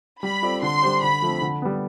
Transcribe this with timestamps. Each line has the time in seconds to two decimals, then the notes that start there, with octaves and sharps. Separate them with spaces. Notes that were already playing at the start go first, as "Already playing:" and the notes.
0.22 G3 B5
0.43 C4 F4 A4 D5
0.62 D3 C6
0.82 G3 D4 G4 C5
1.02 D3 B5
1.22 F3 A3 C4
1.42 D3
1.62 G3 B3